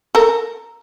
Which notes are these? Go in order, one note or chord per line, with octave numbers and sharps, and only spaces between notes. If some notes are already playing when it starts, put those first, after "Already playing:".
A4 A#4